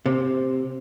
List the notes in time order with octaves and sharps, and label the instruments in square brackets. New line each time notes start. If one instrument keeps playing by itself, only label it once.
[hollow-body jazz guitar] C3